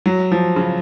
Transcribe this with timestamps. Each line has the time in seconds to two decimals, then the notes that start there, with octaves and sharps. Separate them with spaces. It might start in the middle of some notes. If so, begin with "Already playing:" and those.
0.06 F#3
0.32 F3
0.56 C#3